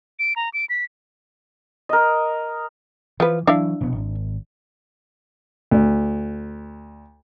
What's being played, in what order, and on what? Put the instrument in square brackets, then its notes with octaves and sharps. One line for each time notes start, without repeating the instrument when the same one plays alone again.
[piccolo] D7
A#5
D7
B6
[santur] A#4 D#5
[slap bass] E3 [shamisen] F3 B4
[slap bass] E3 F#3 [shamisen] D4 E4 F5
[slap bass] F1 B2 B3
G#1
[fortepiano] D2